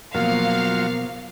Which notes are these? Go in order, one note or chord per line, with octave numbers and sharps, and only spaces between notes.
B2 F3 F#3 A#3 F4 F5